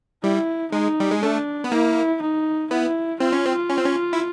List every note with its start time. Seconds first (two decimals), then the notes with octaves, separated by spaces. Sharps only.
0.24 G3 E4
0.72 G#3 D#4
1.00 G3
1.11 G#3
1.22 A3 D4
1.64 B3
1.72 A#3 E4
2.22 D#4
2.71 B3 E4
3.20 C4 F4
3.33 C#4
3.46 C4
3.70 C#4
3.78 C4
3.85 C#4
4.13 E4